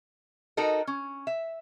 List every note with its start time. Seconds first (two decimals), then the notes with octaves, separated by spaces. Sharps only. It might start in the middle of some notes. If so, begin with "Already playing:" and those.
0.57 D#4 F#4 A4 A#4 D#5
0.87 C#4
1.27 E5